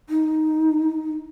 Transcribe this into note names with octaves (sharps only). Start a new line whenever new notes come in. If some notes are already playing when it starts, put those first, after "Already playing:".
D#4